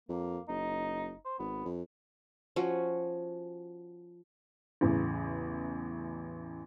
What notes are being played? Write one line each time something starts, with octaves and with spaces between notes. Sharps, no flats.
F2 A#3
F#1 D#4
C5
G#1 B3
F2
F3 C#4 F#4
A1 E2 C#3